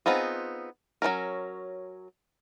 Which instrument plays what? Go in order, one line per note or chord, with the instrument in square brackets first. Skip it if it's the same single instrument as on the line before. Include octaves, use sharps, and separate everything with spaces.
[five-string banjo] B3 C4 D#4 F4 G#4
F#3 A3 C#4 A#4